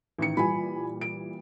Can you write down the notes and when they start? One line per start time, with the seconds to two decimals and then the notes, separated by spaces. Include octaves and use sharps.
0.18 A1 D#3 C#7
0.37 A#2 E3 G3 G#5 B5
1.01 D7